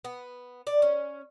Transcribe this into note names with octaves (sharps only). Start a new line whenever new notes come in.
B3
D5
C#4